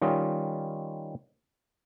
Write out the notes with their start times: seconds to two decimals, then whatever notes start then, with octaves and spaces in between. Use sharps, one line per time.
0.01 D#3 G3 C#4 F4 D#5